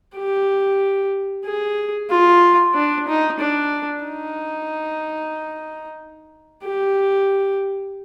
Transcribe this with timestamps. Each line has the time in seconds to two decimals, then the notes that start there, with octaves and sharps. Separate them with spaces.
0.16 G4
1.45 G#4
2.09 F4
2.75 D4
3.07 D#4
3.39 D4
4.05 D#4
6.64 G4